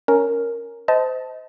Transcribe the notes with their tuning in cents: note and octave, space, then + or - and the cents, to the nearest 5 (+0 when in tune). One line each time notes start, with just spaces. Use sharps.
C#4 +10 A#4 +0
C5 -25 D#5 +25 A5 +0